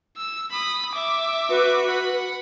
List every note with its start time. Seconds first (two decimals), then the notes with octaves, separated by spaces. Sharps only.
0.17 E6
0.51 B5 D#6
0.92 E5 D6
1.50 F#4 B4
1.87 F#5 B5